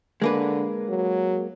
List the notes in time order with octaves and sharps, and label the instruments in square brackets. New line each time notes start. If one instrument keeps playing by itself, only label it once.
[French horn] D3 [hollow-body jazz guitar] G#3 A#3 B4
[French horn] F#3